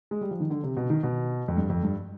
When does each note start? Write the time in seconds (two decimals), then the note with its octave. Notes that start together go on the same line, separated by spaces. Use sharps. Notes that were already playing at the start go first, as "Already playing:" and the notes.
0.11 G#3
0.21 G3
0.31 F3
0.40 D#3
0.50 D3
0.63 C3
0.77 B2
0.90 D#3
1.03 B2
1.48 F2
1.57 G2
1.70 F2
1.83 G2